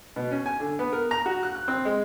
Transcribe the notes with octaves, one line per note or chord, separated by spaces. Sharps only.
B2
C#4
G#5
D3
B3
A#4
A#5
F#4
F#6
F#6
C4
G#3